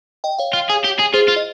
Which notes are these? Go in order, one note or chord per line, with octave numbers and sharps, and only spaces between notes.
D#5 G5
C#5 F5
F4
G#4
G4
G#4
F4 G#4 C5
F4
D#5